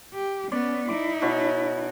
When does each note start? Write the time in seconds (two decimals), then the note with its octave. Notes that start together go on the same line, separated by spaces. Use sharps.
0.14 G4
0.52 B3 C#4 D5
0.88 D#4 E4 D6
1.22 B2 C#5